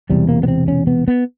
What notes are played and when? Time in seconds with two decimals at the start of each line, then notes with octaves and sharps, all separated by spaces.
0.10 E1 E2 C3 G3
0.29 A#3
0.43 B3
0.48 C4
0.68 C#4
0.87 B3
1.08 B3